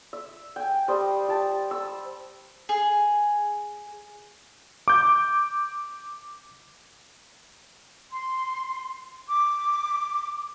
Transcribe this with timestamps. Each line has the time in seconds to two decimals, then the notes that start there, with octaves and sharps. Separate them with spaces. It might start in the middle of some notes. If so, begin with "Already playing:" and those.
0.13 E5
0.56 G5 G#5
0.88 G3 C5 D#5
1.28 G4 A5
1.71 E6
2.69 G#4
4.88 D6 G6
8.11 C6
9.28 D6